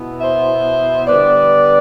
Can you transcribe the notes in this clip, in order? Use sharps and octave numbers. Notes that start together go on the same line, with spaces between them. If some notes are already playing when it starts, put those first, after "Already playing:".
Already playing: B2 B3 E4
C5 E5
D3 G3 B3 B4 D5